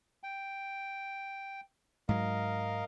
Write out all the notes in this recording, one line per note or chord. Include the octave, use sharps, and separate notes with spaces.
G5
G#2 F#3 A#4 D#5 F5